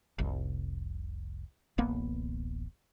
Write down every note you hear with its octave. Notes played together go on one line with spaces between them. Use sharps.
F1 C2
D1 A1 A#3 B3